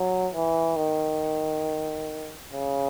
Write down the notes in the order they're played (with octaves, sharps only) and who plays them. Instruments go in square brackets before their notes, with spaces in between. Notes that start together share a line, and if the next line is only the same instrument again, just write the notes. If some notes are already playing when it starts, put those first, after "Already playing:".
Already playing: [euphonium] F#3
E3
D#3
C#3